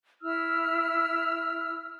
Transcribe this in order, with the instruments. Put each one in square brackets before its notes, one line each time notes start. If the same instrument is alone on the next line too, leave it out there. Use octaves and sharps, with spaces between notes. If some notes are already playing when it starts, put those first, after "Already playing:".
[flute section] E4 E6 F6